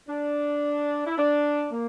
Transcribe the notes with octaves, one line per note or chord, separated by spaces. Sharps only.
D4
E4
D4
A#3